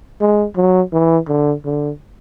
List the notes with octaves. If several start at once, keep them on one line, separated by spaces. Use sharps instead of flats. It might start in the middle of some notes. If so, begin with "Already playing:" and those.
G#3
F#3
E3
D3
D3